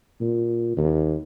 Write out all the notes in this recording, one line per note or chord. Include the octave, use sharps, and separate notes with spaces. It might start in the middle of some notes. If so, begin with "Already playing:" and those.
A#2
D#2